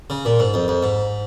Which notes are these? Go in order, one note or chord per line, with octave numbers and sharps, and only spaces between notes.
C#3
A#2
G#2
F2
F2
G#2